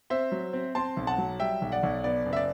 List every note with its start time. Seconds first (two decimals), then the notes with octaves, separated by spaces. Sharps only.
0.10 C4 C5 E5
0.32 F#3
0.53 C4
0.75 C4 A5 C6
0.97 B1
1.07 F#5 A5
1.18 F#3
1.40 G3 E5 G5
1.62 B1
1.72 D5 F#5
1.83 B1
2.04 B3 D5
2.26 F#1
2.33 E5
2.36 D5